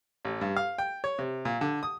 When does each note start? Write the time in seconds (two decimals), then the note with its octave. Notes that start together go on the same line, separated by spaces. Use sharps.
0.25 A1
0.41 G2
0.56 F5
0.78 G5
1.04 C#5
1.19 C3
1.45 A#2
1.61 D3
1.83 D#6